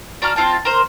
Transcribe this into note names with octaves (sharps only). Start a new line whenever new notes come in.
D4 F#4 A#5 F6
C4 F4 G5 A5
A#4 C5